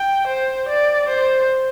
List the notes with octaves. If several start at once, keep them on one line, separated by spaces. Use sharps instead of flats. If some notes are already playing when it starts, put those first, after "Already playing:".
Already playing: G5
C5
D5
C5